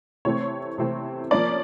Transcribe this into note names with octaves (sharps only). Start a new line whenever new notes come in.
C3 E3 A3 C4 C#5
C3 E3 A3 C4
F3 A#3 C#4 D5